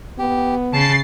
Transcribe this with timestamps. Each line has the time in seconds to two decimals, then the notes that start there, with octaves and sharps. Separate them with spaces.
0.19 B3 G4
0.73 C#3 A5 A6 C7